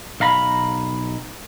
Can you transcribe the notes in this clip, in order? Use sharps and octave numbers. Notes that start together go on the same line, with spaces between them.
B1 F5 A#5 B5